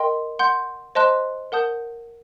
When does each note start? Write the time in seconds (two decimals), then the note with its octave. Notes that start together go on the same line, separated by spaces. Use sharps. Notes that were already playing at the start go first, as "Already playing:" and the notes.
Already playing: A#4 D#5 G5 C6
0.39 F#5 C6 G6
0.95 C5 D#5 A5 C6 F#6
1.52 A#4 F#5 A5 D#6 G6